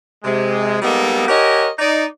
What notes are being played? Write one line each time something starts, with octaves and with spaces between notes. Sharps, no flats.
C3 G#3
G3 G#3 A#3 B3 D#4 A4
G4 A#4 C#5 D#5 F#5 G#5
D#4 D5